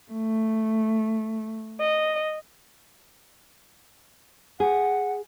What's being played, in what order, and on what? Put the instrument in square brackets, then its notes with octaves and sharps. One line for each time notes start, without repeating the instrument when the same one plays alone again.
[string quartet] A3
D#5
[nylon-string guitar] G#4 [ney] F#5